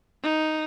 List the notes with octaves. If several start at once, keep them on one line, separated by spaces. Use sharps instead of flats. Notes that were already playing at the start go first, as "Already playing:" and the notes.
D#4